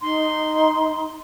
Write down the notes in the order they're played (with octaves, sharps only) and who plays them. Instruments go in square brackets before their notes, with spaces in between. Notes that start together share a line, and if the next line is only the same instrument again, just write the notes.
[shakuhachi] D#4 [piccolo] C6